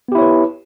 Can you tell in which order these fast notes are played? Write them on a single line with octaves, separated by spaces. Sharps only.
B3 G4 E4 C#5 B4